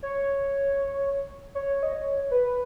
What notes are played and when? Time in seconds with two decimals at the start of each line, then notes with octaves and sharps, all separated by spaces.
0.03 C#5
1.55 C#5
1.83 D#5
1.93 C#5
2.31 B4